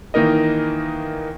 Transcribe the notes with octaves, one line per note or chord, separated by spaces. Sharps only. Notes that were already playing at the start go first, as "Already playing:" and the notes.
D#3 E3 A#3 D#4 A#4 D#5